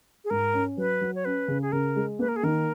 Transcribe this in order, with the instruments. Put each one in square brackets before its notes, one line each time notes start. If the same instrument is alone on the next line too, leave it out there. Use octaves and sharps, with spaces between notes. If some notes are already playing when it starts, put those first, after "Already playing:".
[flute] G#4
[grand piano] G#2 [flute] A#4
[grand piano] C#4
[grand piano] F#3 [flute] B4
[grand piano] F#3
[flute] C#5
[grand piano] C#4 [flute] B4
[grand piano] C#3
[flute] G#4
[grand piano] C#3 [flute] A#4
[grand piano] G#3
[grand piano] A#3 [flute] B4
[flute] A#4
G#4
[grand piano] D#3 [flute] A#4